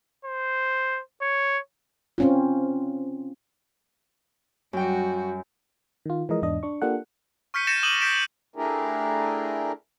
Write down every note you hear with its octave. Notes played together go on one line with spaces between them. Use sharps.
C5
C#5
C4 C#4 F4
F#2 G3 F#4 G5
D#3 F4
E3 F3 G#3 A#4 D#5
E2 G#2 D4 D#5
D4 C#6
A#3 D4 F4 G4 A4 F#5
C#6 F6 G6 B6 C#7 D#7
G6 A6 A#6 C#7 D#7 E7
D6 D#6 D#7 E7 F#7 G7
G6 B6 D7 E7
A3 D4 E4 G4 G#4 A#4